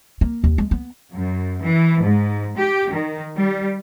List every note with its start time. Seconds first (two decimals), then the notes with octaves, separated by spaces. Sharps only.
0.21 A#3
0.44 D#2
0.58 G#3
0.71 B3
1.13 F#2
1.60 E3
2.02 G#2
2.55 G4
2.91 D#3
3.36 G3